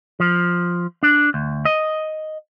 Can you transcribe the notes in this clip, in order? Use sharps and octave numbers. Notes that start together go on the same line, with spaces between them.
F3
D4
D2
D#5